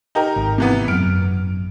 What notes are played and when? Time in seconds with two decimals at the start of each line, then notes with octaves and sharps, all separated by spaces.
0.15 D#4 G4 A#4
0.36 G#1
0.58 C3 E3 B3
0.88 G#1 F#2 F6 D7